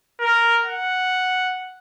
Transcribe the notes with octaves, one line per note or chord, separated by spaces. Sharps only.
A#4
F#5